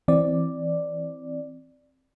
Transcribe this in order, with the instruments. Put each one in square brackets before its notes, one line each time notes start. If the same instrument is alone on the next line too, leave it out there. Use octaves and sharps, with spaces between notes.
[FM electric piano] E3 C4 D5